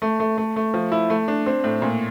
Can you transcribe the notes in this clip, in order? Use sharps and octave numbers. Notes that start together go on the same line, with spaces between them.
A3
A3
A3
A3
F3
E4
A3
D4
C4
A2
A#2